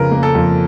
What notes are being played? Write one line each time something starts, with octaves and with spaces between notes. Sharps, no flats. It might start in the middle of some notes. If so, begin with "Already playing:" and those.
Already playing: F2 C#3 F3 A#4 B4
A#3
A4
F2